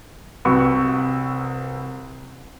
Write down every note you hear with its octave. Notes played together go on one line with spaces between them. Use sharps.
C2 C3 F#4 B4 C#6